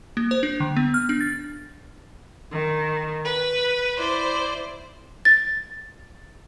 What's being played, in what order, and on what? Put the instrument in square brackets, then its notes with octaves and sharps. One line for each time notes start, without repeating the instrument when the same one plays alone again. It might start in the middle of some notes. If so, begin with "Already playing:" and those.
[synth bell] A#3
C5
D4
D3
B3
F6
D4
A6
[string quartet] D#3
B4
E4 C5 D5
[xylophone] A6